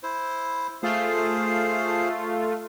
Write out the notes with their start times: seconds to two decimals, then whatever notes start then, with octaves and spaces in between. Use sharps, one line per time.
0.03 E4 C5
0.83 A3 F4 G#4 C5 F5